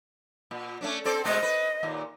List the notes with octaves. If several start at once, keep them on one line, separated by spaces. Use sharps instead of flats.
A#2
A3 C#4 D4
C4 A4 C5 D5
B2 G#3 A3 D#5
B4
D#2 A#2